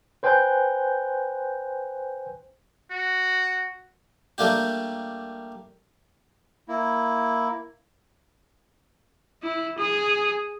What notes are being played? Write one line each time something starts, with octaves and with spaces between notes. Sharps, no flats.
B4 C5 G5 G#5 F#6 G6
F#4
G3 A3 A#3 D4 G4
A#3 E4
E4
G#4